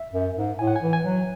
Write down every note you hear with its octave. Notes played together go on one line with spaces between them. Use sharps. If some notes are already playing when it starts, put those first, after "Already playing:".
Already playing: E5
F#2
G#2
A2 G#5
F#5
G#5
E3
G#5
F#3